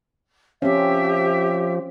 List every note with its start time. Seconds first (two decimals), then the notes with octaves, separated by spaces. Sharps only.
0.62 F3 C4 C#4 G4 E5